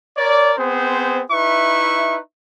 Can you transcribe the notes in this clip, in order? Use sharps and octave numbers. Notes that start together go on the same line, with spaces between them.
A#4 C#5 D5
B3 C4 G#4 C5
D#4 E4 B4 E5 C#6